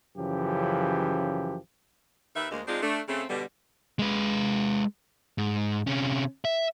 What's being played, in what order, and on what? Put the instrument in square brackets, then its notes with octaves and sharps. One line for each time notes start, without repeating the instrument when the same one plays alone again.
[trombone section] F#2 C#3 E3 F3 G4
[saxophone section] D#2 D#3 B4 E5
D2 G#3 A#3
G#3 C4 D4 D#4 F4 G#4
A3 D4
C#3 A3 C4
B2 D3 G3
[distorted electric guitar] G#3 B4
G#2
C3 C#4
E5